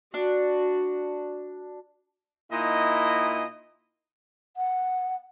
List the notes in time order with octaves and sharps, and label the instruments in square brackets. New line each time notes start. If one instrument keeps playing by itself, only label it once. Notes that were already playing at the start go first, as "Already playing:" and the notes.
[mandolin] D4 [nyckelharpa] F#4
[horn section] A#2 D#4 E4 D#5
[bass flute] F#5